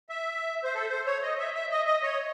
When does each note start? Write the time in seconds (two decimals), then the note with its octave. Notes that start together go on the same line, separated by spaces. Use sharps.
0.09 E5
0.64 C5
0.74 A4
0.90 C5
1.06 C#5
1.22 D#5
1.39 E5
1.55 E5
1.71 D#5
1.87 D#5
2.03 C#5